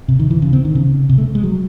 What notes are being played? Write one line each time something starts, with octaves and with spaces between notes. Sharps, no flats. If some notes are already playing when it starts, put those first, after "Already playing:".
C3
D#3
E3
C#3
C4
D#3
C#3
C3
A3
G#3
F#3